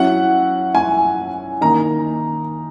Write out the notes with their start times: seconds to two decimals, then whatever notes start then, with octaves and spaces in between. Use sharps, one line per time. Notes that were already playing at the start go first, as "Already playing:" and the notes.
Already playing: F#3 C#4 E4 F#5
0.75 G#5
1.61 D#3 A#3 D#4 A#5